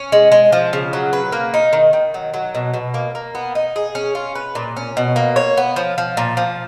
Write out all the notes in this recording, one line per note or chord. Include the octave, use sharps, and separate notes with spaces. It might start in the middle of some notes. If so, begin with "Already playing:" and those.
Already playing: C#4
G#3
G#3
F3
C#3
F#3
B4
A#3
D#4
D#3
D#3
F#3
F#3
B2
B2
A#3
A#3
B3
D#4
G#4
C#4
F4
B4
A#2
C#4
B2
A#3
C#5
B3
F3
F3
A#2
F3